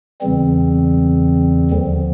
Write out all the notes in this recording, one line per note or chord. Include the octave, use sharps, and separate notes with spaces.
E2 C#3 E3 G3 C4
D#2 D3 F3